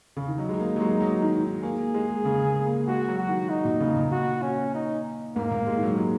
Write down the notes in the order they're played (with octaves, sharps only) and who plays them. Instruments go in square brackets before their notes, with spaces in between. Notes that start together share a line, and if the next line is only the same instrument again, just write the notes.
[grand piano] C#3
D#3
[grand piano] F#3 [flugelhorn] D#4
[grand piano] G#3
A#3
F#3
G#3
F#3
D#3
D#3
[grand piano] A#3 [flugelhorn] G#4
[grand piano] G#3
C#3
A#3
A#3
[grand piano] G#3 [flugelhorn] F#4
[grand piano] F#3
[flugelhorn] F#4
[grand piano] D#3
[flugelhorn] D#4
[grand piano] A#2
C#3
A#2
[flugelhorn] F#4
C#4
D#4
[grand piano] G#2 [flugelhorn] A#3
[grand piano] A#2
G#3
D#3
F#3
G#3